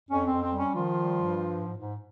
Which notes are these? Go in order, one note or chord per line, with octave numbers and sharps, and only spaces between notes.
F2 C#4
C4
F2
C4
G3
C#4
D#3 F3 F4
G3
G2
F3
G#2
G#2